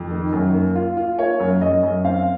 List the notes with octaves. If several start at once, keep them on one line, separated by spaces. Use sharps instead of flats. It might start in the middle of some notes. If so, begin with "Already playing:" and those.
Already playing: F2
D#3
F#2
A#3
F4
F4
A#3 C#5
F#2
F#2 D#5
F#2
C4 F5